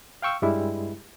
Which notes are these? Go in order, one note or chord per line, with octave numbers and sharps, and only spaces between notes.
F5 G5 C#6 E6
G2 G3 G#3 E4